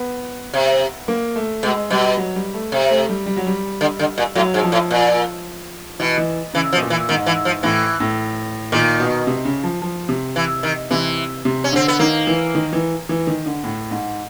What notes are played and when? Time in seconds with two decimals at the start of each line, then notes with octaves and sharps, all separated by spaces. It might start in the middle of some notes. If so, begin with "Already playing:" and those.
Already playing: B3
0.54 C3
1.08 A#3
1.36 A3
1.63 B2 G#3
1.90 B2 G3
2.17 F#3
2.36 G3
2.54 A3
2.72 C3
2.90 A3
3.09 G3
3.26 G3
3.37 F#3
3.47 G3
3.81 D3
3.99 D3
4.18 A#2
4.35 A2 F#3
4.54 G#2
4.63 F3
4.72 A2
4.91 A#2
5.99 B2 E3
6.18 E3
6.54 C#3 E3
6.73 B2 F3
6.81 A#2
6.90 E3
7.09 G#2 D#3
7.26 E3
7.45 F3
7.63 A2 E3
8.00 A2
8.72 A#2 D#3
9.00 B2
9.27 C3
9.45 C#3
9.63 F3
9.82 F3
10.09 C3
10.36 E3
10.63 D#3
10.91 C3 E3
11.45 C3
11.64 C#4
11.73 D3 C4
11.88 B3
11.99 D#3 A#3
12.27 E3
12.55 D#3
12.73 E3
13.09 E3
13.27 D#3
13.46 D3
13.64 A2
13.91 G#2